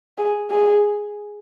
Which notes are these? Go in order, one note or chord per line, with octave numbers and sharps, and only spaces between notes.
G#4
G#4